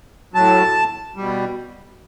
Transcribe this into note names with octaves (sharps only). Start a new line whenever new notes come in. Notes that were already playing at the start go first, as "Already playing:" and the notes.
A2 F#3 A5
B2 G3